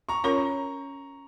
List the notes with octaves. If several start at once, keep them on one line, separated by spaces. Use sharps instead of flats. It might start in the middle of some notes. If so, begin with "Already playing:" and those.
A#5 C#6
C#4 F4 A#4 C#5 A#5 C#6